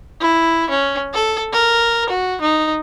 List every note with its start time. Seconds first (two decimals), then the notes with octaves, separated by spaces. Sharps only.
0.21 E4
0.70 C#4
1.14 A4
1.52 A#4
2.09 F#4
2.41 D#4